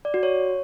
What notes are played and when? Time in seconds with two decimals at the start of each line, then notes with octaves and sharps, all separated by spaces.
0.05 D5
0.14 F#4
0.23 C#5